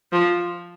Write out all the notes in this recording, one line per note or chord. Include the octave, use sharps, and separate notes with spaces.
F3